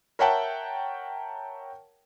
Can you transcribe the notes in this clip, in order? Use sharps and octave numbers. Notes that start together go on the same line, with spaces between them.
A#4 C#5 E5 F#5 G5 A5